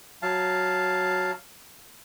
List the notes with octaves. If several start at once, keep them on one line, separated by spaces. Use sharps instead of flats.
F#3 F5 A5